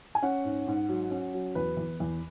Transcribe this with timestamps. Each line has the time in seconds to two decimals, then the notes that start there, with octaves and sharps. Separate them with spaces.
0.15 G#5
0.22 C#4 F#5
0.45 G#2
0.67 G#2
0.89 F#3
1.11 C#4
1.34 F#3
1.55 E2 B4
1.77 E2
2.00 E2